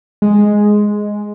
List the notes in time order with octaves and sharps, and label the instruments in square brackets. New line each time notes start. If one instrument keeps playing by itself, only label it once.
[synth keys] G#3